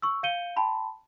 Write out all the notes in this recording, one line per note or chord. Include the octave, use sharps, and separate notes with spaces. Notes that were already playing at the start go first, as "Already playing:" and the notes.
C#6 E6
F5 G6 C#7 D#7 G7
G5 A5 B5 C6